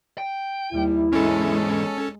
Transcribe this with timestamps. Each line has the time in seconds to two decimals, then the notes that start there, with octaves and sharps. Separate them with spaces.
0.18 G5
0.73 D#2 G3 E4
1.13 E2 G#2 G#3 C#4 A4